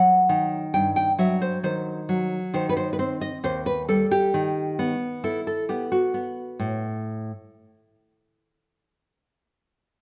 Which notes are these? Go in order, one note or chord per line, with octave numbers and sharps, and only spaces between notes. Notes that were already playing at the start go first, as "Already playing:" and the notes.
Already playing: F#3 F#5
D#3
G2 G5
G5
F#3 E5
C5
D#3 C5
F#3
D#3 C5
B4
C5
B4
C4 C5
D#5
D#2 C5
B4
G3 A4
G4
D#3
B3
E4 A4
A4
B3 G4
F#4
B3
A2